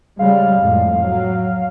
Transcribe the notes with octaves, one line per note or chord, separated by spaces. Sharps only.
C#3 G3 G#3 F5
F2 A2
F#3